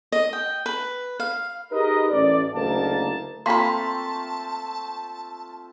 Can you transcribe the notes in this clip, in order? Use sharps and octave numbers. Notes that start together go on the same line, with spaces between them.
D#5
G5
B4
F5
D#4 G4 G#4 A#4 B4 D#5
A1 D5
F#1 D2 A3 A#3 D#4 A5
A3 A#3 C4 F4 A5 B5 C6 B6